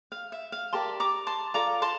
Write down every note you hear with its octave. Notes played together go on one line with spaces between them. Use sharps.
F5
E5
F5
G4 A#4 D5 A5 C6
A#5 D6
A5 C6
F4 A4 D5 A#5 D6
A5 C6